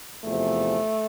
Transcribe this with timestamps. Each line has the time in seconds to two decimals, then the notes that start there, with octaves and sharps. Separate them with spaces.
0.24 E2 C3 F3 A3